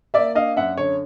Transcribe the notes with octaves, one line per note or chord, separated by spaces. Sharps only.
A#3 D5 E5
D4 D#5 F5
F#2 E5 F#5
D3 C#5